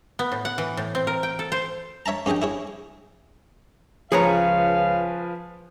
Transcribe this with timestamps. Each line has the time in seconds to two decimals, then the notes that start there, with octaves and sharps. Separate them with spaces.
0.19 B3
0.32 A2
0.45 F#5
0.58 E3
0.77 A2
0.95 C4
1.07 A#4
1.23 G5
1.39 A4
1.52 C5
2.06 C#5 E5 A5 A#5
2.26 G2 C#4 G#4 D#5 G5
2.42 E4 G#4 C#5
4.12 C#2 F3 G#4 B4 C#5 F5 G#5 A#5